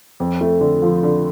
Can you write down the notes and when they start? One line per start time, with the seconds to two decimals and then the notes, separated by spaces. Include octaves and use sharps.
0.20 F2
0.41 A3
0.61 D3
0.82 F3
1.03 D3